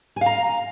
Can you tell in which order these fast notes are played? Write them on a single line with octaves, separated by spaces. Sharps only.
G#5 F5 A#5